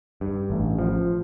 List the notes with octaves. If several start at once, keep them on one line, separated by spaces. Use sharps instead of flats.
G2
A1
F3